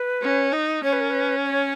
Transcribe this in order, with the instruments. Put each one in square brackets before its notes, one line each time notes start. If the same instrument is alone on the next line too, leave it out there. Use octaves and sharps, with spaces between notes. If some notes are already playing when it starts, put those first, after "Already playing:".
Already playing: [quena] B4
[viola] C#4
D#4
[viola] C#4 [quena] C#5
[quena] B4
A#4
B4
C#5